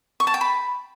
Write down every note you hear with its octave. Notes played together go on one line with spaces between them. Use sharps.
C#6
A5
G5
B5